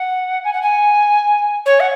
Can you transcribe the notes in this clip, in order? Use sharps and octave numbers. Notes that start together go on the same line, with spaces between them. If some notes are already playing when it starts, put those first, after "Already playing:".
Already playing: F#5
G#5
F#5
G#5
C#5
F#5